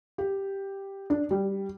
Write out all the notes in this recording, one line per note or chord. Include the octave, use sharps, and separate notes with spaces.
G4
D4
G3